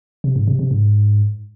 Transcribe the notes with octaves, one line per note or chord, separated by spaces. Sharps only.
C3
G#2
C3
C3
G#2